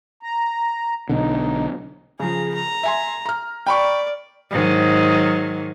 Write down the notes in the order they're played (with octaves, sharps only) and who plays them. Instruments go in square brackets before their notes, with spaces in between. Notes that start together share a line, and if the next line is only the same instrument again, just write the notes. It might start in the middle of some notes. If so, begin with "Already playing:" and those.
[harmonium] A#5
[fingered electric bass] B1 B2 D3 [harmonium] D#4
[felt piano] C#3 F3 [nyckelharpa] G#4 A#5
[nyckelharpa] A#5
[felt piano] E5 G#5 C6
A#5 F6
[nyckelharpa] D5 [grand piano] G5 B5 C#6
[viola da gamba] G#2 D#3 F#3